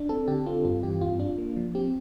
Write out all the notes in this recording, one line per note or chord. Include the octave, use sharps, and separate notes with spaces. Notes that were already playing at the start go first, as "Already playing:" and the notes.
Already playing: D4
C4 A4
D3 G4
C4 F4
G2 F4
E3 G4
G2 F4
D4 F4
A#3
F3
C4 G4